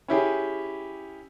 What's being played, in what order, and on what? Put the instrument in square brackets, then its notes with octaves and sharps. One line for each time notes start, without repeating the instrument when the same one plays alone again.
[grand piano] C#4 E4 G4 G#4